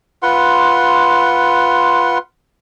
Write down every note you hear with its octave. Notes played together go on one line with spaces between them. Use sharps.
F4 B4 F#5 C6